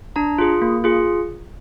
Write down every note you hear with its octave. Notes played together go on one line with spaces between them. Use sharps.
D4 A#5
F4 G#4
A#3
F4 G#4